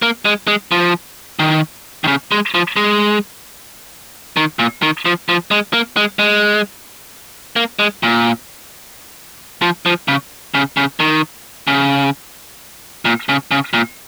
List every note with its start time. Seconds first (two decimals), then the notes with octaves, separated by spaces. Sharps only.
0.02 A#3
0.25 G#3
0.48 G#3
0.72 F3
1.39 D#3
2.04 D#3
2.08 C#3
2.32 G#3
2.54 F3
2.76 G#3
4.37 D#3
4.59 A#2
4.82 D#3
5.05 F3
5.29 F3
5.51 G#3
5.73 A#3
5.97 G#3
6.19 G#3
7.56 A#3
7.79 G#3
8.03 A#2
9.62 F3
9.86 F3
10.08 C#3
10.55 C#3
10.77 C#3
11.00 D#3
11.68 C#3
13.05 A#2
13.29 C#3
13.51 C#3
13.73 A#2